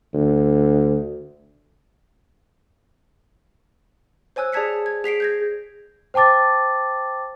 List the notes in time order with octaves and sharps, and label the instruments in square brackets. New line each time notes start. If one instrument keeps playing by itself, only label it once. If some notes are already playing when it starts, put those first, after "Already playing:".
[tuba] D2
[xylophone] C5 C#5 G#5 E6 F#6
G#4 D5 A5 G#6 B6 C#7
G#6
G#4 B6 C7 D7
G6 G#6 A#6
[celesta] C5 G5 A5 D6 A6